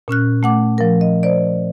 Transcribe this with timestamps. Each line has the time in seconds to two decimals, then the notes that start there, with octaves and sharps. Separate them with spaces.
0.08 A#2 C#4 F6 F#6
0.43 A3 F#5 D6
0.78 F3 A#4
1.01 D#5
1.23 C5 D5